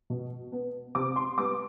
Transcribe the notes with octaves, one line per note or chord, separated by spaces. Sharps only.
B2
B3
C3 D6
C6
G3 B3 D6